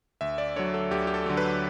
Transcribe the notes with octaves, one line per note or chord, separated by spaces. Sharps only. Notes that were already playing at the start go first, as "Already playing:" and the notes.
D2 E5
D5
D3 F#3 C#5
A4
D2 G4
G4
A4
D3 F#3
B4